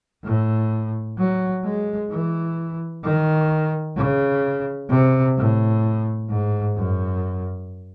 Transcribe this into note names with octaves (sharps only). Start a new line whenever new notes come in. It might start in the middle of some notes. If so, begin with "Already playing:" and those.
A2
F#3
G#3
E3
D#3
C#3
C3
A2
G#2
F#2